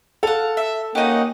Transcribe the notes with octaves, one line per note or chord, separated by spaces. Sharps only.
A4 F5 F#5
E5
A#3 C#4 D#4 G4 D#5 F#5